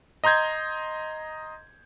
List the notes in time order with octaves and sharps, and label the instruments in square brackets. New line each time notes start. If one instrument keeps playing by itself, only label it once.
[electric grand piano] D#5 A#5 C6 G6 G#6